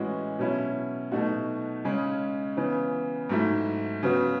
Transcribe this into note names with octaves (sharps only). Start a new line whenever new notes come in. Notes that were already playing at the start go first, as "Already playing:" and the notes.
Already playing: A2 E3 G#3 C#4 F#4
B2 F#3 C#4 E4
B2 F#3 A3 D#4 F#4
C#3 G#3 C#4
C#3 E3 B3
G#2 F#3 A3 E4
C#3 F#3 B3 F#4